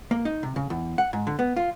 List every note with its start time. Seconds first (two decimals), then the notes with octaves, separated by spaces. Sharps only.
0.11 A#3
0.25 D#4
0.43 C3
0.56 C#3
0.70 E2
0.98 F#5
1.13 G#2
1.27 D3
1.39 B3
1.56 F4